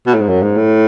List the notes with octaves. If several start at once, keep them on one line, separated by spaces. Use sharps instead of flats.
B2
A2
G#2
F#2
G#2
A2